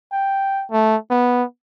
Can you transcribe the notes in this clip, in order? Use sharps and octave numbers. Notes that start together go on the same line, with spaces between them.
G5
A3
B3